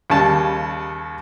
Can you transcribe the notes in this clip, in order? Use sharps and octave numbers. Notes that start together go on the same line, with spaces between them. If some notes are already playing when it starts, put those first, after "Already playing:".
D#2 C#3 G3 A5